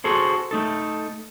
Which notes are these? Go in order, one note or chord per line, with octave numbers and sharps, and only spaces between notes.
F#4 G#4 A4 C5
A3 D#4 A4